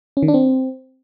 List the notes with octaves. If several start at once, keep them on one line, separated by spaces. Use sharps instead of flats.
C#4
D#3
D4
C4